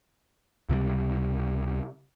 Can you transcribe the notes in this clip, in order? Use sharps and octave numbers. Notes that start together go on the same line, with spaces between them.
C#2 C3 E3 G3